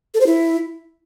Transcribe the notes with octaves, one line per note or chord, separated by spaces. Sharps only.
A4
C5
E4